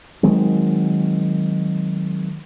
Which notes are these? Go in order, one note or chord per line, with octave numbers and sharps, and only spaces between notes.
D#3 F#3 G#3 C4